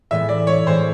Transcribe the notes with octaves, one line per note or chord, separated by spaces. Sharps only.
A2 E3 G#3 B3 E5
D5
C#5
A2 E3 G#3 B3 C5